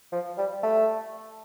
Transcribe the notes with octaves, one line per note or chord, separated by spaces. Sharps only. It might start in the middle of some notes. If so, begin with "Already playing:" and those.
F3
G3
A3